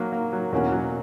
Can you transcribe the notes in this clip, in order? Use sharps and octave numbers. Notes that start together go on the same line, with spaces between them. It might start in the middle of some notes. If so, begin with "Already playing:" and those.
Already playing: F#3 A#3
A#3
F#3
E2 B2 A#3 C#4 F#4
F#3